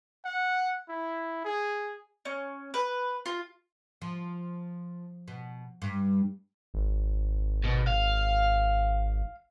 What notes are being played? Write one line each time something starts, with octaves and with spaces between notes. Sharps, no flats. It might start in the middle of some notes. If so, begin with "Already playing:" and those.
F#5
E4
G#4
C#4
B4
F4
F3
B2
G2
G#1
B2
F5